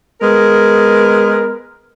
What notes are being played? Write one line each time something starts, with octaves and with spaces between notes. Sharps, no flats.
G#3 B3 A#4